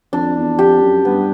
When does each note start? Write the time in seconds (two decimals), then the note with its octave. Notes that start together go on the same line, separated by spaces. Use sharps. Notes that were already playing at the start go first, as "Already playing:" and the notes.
0.13 F2 D4
0.36 E2
0.59 F2 G4
0.81 F#2
1.05 G2 B3